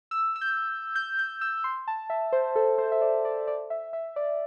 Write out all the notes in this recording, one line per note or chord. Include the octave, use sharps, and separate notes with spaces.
E6
E6
G6
G6
G6
E6
C6
A5
E5
C5
A4
C5
E5
D5
D5
D5
E5
E5
D5